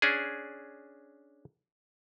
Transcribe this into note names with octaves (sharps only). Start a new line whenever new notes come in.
C#4 D4 G#4